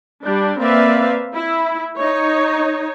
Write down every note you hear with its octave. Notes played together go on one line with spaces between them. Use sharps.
G3 D4
A#3 C4 B4 D5 E5 F5
E4
D#4 C#5